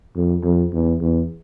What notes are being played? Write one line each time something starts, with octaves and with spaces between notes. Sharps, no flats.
F2
F2
E2
E2